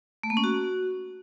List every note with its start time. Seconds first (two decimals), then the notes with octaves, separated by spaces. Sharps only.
0.23 A3
0.30 A#3
0.37 C#4
0.44 F#4